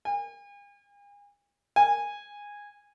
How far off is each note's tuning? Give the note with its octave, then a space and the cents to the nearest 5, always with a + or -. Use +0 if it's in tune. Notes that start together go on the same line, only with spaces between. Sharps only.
G#5 -45
G#5 -15